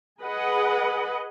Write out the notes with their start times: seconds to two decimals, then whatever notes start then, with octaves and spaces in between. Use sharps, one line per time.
0.22 G#4 B4 D#5 F#5